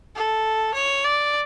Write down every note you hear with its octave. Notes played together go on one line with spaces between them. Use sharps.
A4
C#5
D5